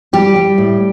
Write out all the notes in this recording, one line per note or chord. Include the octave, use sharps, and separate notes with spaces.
G3 G4
G3
A2